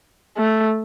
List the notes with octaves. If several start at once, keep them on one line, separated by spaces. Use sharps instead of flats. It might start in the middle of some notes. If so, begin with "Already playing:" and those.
A3